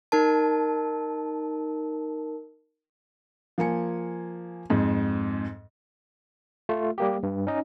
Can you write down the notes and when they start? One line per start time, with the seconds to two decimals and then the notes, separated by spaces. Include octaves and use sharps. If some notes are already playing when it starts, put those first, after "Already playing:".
0.12 D#4 A#4 A5
3.58 F3 A#3 G#5 C#7
4.70 F2 G#2
6.69 A3 F4
6.98 G3 A#3 G4
7.23 G2
7.47 C#4 D#4 D#5